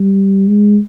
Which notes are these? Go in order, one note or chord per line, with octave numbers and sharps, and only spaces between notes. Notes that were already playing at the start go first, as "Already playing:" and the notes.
Already playing: G3
G#3